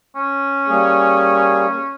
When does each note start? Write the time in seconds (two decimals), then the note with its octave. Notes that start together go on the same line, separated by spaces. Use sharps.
0.16 C#4
0.68 G3 A#3 G#4